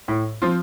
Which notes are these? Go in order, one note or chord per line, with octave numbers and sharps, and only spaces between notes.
A2
F3 C4 F4